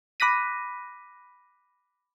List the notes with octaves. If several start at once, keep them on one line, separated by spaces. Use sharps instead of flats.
B5 D6 F#6 A#6 B6 D#7